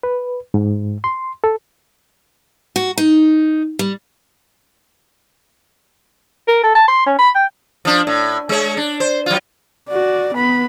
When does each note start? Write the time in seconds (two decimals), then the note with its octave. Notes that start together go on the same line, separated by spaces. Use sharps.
0.03 B4
0.54 G#2
1.04 C6
1.44 A4
2.76 F#4
2.98 D#4
3.79 G3
6.48 A#4
6.63 A4
6.75 A5
6.88 C6
7.07 C#4
7.19 B5
7.35 G5
7.85 F3 D4
8.07 A2
8.49 G#3 C#5
8.77 D4
9.00 C5
9.26 F#3 F4
9.89 F#4 D5
10.35 B3 B5